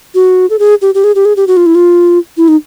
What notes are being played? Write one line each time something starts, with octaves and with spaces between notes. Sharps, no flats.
F#4
A4
G#4
G4
G4
G#4
G4
G#4
G4
F#4
F4
E4
F4
E4
D#4